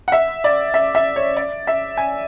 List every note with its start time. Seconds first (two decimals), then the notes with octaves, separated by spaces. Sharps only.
0.08 F#5
0.12 E5
0.44 D5
0.74 E5
0.95 E5
1.16 C#5
1.36 D5
1.67 E5
1.97 G#5